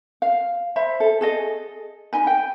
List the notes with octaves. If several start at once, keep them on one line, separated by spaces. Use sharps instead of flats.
F5
C5 E5 B5
A4
G#4 A4 D#5
D#4 G#5 B5
G5